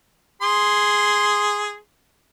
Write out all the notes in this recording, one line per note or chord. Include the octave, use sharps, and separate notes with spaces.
G#4 C6